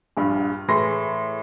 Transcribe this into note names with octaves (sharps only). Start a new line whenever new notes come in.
A#1 G2
A2 E3 G#4 C6 A#6